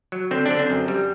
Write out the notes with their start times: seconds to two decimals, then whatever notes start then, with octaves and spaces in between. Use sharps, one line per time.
0.12 F#3
0.31 D3 C4
0.46 D3 D4
0.59 C4
0.70 F#2
0.88 G3